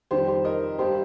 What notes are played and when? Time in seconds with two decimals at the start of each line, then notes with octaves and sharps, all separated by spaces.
0.11 F2 D#3 G3 G4 C5
0.28 G4 C5
0.45 A#4 D#5
0.79 G2 G3 C4 G4 C5